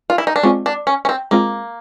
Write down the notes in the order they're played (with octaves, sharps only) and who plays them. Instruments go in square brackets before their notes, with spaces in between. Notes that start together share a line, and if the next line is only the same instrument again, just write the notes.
[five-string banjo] F4
E4
D#4
D4
[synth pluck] G#3 C4 F4 [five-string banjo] C#4
[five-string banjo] D4
C#4
C#4
C4
[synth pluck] G#3 C4 F4 [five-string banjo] A#3